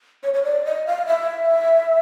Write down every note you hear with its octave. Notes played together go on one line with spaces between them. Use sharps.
C#5
C#5
D5
D#5
F5
E5